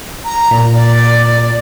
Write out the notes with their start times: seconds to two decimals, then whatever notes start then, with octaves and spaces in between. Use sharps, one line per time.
0.25 A#5
0.51 A#2
0.73 D5